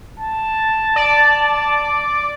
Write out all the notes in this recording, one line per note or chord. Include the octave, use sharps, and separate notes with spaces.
A5
D5